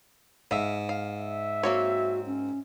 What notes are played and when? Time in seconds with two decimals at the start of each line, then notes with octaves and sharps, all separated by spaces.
0.51 G#2 E5 F5
0.89 F5
1.18 E5
1.63 A#3 C4 F#4 C#5
2.26 C#4